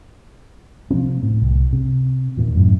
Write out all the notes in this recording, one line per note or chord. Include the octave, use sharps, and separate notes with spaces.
C3 F3 A#3 C4
A2
C2
C3
E2 A#2 D#3
F#2 A2